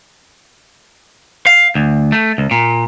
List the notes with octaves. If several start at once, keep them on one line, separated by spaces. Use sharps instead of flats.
F5
D2
A3
C#2
A#2